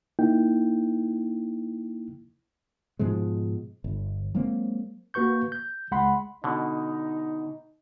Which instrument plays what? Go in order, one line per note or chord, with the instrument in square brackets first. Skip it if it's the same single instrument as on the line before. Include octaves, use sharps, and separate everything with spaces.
[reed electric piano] A#3 D#4 E4 G5
[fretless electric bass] G#2 B2 F3 G#3
G1
F#3 G#3 A#3 C4
[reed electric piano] A#3 F#4 B4 C#6 G6
G6
C#2 G#3 F#5 B5 C6
[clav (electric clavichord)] B2 D3 [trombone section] D#4